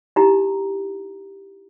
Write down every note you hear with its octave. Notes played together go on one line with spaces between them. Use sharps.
D#4 E4 G4 A#5